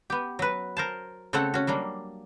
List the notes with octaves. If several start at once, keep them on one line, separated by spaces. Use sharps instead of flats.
B3 G4
F#3 B4
A#4 C5 A5
C#3 A3 C4 A4 C#5 F#5
C#4 F#4
F#3 G3 A#3 D4